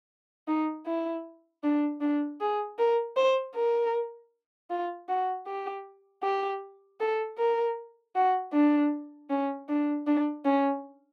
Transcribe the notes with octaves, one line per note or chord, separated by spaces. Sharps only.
D#4
E4
D4
D4
G#4
A#4
C5
A#4
F4
F#4
G4
G4
A4
A#4
F#4
D4
C#4
D4
D4
C#4